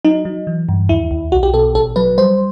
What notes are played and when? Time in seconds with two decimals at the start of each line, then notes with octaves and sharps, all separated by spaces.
0.05 F#3 D#4
0.25 F#3
0.47 E3
0.69 G2
0.89 D#2 E4
1.11 D#2
1.32 B1 F#4
1.43 G4
1.54 B2 A4
1.75 A1 A4
1.96 F#3 B4
2.18 G3 C5